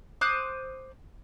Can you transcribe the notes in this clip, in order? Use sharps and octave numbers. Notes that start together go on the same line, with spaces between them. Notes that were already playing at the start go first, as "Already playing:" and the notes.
C5 D6 D#6 F#6